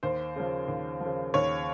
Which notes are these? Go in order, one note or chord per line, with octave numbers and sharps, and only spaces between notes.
D#2 C5
C#3 F3
D#2
F3
C#3
D#2 C#5